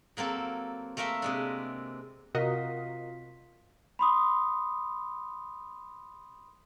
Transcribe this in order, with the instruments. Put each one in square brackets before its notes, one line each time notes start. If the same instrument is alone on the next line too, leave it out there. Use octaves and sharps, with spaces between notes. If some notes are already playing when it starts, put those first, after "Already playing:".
[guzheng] F#3 A#3 C4 A4
A3 A#3 A#4 E5 C6
C3 G#3 D4
[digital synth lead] C3 [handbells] F4 F5 B6 [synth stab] F#4 A#4 D#5
[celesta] B5 C6 D#6